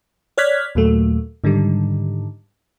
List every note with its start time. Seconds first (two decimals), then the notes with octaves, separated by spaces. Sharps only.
0.38 C#5 D5 F6 F#6 G#6 B6
0.75 D#2 A#2 F#3 A3
1.44 G#2 D3 D#3 G3